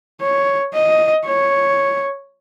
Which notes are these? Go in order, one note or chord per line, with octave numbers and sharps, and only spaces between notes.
C#5
D#5
C#5